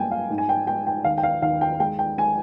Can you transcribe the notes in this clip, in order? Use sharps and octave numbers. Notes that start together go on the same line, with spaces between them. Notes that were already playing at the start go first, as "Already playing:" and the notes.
Already playing: G2 G#3 A#3 G5 G#5
F5
G#2
G#5
G5
G#3 G5
G5
D#2 F5
G5
F5
D#2 F5
G5
G#3 G5
G5
G#3 G#5